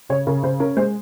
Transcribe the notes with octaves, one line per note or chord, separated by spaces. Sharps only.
C#3 C#5
C#3 A#4
C#3 C5
C#4 A#4
G#3 C5